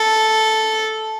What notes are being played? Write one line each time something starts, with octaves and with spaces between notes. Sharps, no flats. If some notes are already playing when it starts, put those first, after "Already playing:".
Already playing: A4